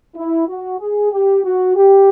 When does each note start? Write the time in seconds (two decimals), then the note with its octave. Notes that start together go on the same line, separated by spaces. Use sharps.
0.15 E4
0.48 F#4
0.80 G#4
1.11 G4
1.44 F#4
1.76 G4